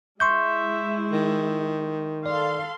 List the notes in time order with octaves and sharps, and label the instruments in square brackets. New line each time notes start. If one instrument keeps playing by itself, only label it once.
[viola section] G#3 E4 [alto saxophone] E5 [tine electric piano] C6 C#6 G6
[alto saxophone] D#3
[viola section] A4 F5 C6 [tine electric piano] D5